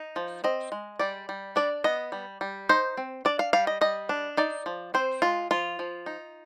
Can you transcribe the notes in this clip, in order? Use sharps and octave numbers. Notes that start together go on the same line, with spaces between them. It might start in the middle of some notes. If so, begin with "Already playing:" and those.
Already playing: D#4
F3
C4 D#5
G#3
G3 D5
G3
D4 D5
B3 D#5
G3
G3
D#4 C5
C4
D4 D5
F5
G3 F5
D#5
G3 D#5
D4
D#4 D5
F3
C4 C5
G#3 F4
F3 F4
F3
D#4